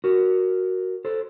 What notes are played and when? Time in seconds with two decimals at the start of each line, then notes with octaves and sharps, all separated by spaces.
0.04 F#4 A#4
1.05 A4 C5